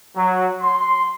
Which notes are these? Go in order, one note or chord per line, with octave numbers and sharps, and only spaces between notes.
F#3
C6